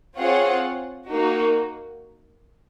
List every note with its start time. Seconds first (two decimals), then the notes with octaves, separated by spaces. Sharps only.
0.18 C4 F4 G#4 C#5 F#5
1.10 A#3 D#4 F#4